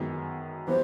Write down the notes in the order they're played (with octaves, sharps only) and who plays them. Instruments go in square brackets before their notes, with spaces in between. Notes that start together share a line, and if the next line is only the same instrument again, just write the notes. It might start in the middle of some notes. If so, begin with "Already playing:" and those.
Already playing: [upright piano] F#2 D#3 G#3 B3
[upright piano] E3 G3 B3 [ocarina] C5